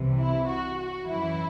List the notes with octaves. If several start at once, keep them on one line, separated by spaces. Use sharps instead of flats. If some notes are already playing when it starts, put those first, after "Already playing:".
Already playing: C2 C3 E3
E4
F#4
F#4
F#2 E3 E4